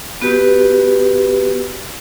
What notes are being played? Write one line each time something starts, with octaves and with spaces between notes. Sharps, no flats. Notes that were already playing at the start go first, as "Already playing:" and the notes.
B3 F#4 G4 B4